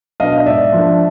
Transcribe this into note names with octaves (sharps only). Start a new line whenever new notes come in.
B2 F#3 B3 D4 D#5 F5
D#5
G#2 D5 E5
F3 A#3 D4